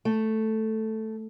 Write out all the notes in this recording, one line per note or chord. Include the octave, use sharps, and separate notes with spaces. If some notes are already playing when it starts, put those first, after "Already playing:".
A3